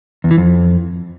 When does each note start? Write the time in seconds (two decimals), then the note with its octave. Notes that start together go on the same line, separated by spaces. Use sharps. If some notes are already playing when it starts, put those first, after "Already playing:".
0.24 E2
0.31 E3
0.38 F2